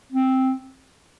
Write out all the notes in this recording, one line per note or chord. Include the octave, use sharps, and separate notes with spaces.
C4